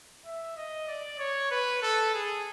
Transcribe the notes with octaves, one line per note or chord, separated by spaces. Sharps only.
E5
D#5
D5
C#5
B4
A4
G#4